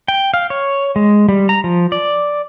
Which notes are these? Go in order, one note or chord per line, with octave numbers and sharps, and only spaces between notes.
G5
F5
C#5
G#3
G3
A#5
F3
D5